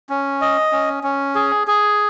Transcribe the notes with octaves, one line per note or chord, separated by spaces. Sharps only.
C#4
D#5
C#4
C#4
G#4
G#4